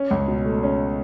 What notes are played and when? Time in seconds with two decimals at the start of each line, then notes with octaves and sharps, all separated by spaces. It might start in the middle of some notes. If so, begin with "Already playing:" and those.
Already playing: C#4
0.11 C#2
0.28 B2
0.45 A3
0.63 C#4